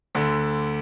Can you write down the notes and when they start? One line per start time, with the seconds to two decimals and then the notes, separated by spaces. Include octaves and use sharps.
0.15 D2 D3